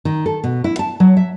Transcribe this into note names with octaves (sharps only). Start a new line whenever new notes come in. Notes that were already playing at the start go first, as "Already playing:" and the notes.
D#3
A4
B2
E4
A5
F#3
E5